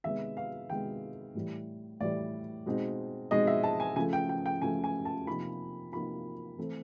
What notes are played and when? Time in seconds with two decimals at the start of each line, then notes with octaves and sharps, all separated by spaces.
0.04 C3 D#3 G#3 B3 E5
0.37 F5
0.70 C3 D#3 G#3 B3 G5
1.35 A2 E3 G3
2.00 A2 E3 G3 D5
2.66 B2 G#3 C4 D#4
3.31 B2 G#3 C4 D#4 D#5
3.47 E5
3.63 A5
3.80 G#5
3.96 C#3 F3 A3 G#5
4.13 G5
4.29 G5
4.46 G5
4.62 C#3 F3 A3 G#5
4.84 G#5
5.05 A5
5.27 C3 F3 A#3 D#4 B5
5.92 C3 F3 A#3 D#4 B5
6.58 E3 A3 C4